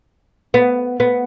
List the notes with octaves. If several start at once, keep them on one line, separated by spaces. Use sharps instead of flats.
B3
B3